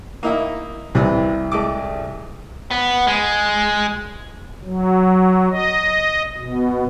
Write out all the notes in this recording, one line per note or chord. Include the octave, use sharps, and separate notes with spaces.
A#3 D#4 E4
C2 C3 E3
G#3 A3 D6
B3
G#3
F#3
D#5
B2